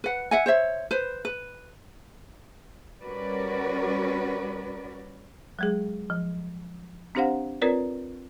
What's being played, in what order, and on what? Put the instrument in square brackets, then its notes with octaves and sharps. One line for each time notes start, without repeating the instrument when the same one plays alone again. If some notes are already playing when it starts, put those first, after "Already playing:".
[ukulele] B4 F#5
E5 F#5 G#5
C5 C#5 E5
B4 C5
B4
[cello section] G3 C#4 F#4 A#4 B4 D5
[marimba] F#3 G#3 G#4
F3
C4 D4 G4 C5 F5 F#5
C4 F4 A#4 B4 C#5 D5